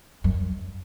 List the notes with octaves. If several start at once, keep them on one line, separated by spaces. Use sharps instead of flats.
F#2